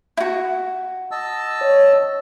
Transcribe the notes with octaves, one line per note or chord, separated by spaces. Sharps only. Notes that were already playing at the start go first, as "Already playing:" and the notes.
E4 F#4
D#5 A5 E6
C#5